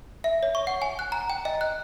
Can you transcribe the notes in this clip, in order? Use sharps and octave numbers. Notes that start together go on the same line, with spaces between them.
E5
C#5
C#6
F#5
G#5
F#6
A#5
G5
D#5
F#6